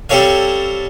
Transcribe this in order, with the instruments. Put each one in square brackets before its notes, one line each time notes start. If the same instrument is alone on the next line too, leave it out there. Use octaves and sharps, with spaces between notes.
[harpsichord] G3 C4 A4 C#5 F5